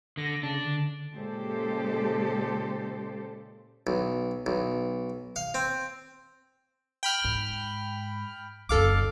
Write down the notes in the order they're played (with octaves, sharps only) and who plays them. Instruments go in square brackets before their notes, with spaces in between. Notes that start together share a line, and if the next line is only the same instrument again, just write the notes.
[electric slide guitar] D3 [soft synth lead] A#6
[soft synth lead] C#3 [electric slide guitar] D4
[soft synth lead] D3
[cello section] A#2 C#3 G#3 G4 A4 C5
[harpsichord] B1
B1
F5
C4
[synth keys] G5 B5 F6
[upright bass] G#2
[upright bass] F#1 D2 [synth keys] A4 F5 D6